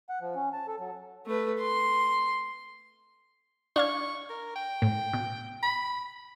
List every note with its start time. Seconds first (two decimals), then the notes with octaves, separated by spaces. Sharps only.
0.09 F#5
0.21 F3
0.35 C#4
0.53 A5
0.68 A4
0.80 F#3
1.26 A3 B4
1.60 C6
3.76 D4 F5 C#6 G#6
4.29 A#4
4.56 G5
4.82 A2
5.13 B2
5.63 B5